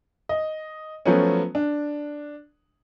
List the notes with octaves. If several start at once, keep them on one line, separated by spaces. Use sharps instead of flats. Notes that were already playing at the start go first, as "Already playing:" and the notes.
D#5
F3 F#3 A3 B3 C#4
D4